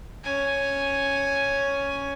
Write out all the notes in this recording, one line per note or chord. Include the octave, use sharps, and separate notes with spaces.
C#4 G#5